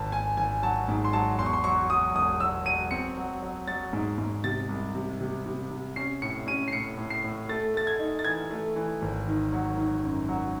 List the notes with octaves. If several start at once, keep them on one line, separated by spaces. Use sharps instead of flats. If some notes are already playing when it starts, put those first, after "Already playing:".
Already playing: G#1 A5
G#1 G#5
G#1 G#5
F#3 A5
G#2
C6
F#3 A5
E2 C6
C#6
C6
F#3 C#6
F#3 D#6
E1 D#6
F#3 E6
F#3 D#7
C4 C#7
F#3
F#3
F#3 A6
G#2
G#2
C3 A6
C2
C3
C3
C3
C3
C#4 C7
A2 C#7
C#4 D#7
C7
A2 C#7
A2
C7
A2
A3 A6
A3 A6
G#6
D#4
A6
E3 G#6
A3
E3
G#1
D#3
F#3
D#3
F#2
F#3